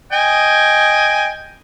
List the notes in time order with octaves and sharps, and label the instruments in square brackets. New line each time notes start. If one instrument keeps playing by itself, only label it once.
[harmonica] D#5 G5 G#5